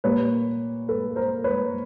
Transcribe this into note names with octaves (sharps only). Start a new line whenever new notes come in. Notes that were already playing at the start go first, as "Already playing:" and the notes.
A#2 G3 A#3 B4 C#5
A4 B4
A#4 C5
B4 C#5